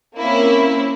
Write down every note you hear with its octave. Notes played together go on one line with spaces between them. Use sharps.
A#3 C4 C#4 E4